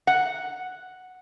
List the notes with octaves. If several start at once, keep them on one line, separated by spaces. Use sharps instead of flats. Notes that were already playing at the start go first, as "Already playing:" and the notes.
F#5